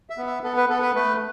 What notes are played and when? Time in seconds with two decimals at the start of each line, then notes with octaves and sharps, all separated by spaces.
0.10 E5
0.18 B3
0.27 E5
0.43 B3 A4
0.57 B4
0.69 B3 A4
0.82 B4
0.95 A3 B4